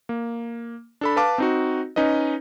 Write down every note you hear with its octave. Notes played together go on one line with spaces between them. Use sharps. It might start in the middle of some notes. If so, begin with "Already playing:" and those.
A#3
D4 A4 B5
B4 F5 A5 D6
C4 D#4 F#4
C#4 D#4 B4 D#5